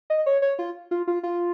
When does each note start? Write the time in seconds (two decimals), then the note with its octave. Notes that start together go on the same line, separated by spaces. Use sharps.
0.10 D#5
0.26 C#5
0.42 C#5
0.59 F4
0.91 F4
1.07 F4
1.23 F4